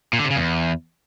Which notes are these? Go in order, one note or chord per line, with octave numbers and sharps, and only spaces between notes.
A#2
D3
C3
C#3
E2